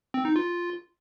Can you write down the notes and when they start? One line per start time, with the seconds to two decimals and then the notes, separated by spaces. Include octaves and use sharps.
0.14 C4
0.25 D#4
0.36 F4